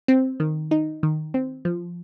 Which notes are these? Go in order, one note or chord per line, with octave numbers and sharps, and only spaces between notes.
C4
D#3
D#4
D#3
C4
F3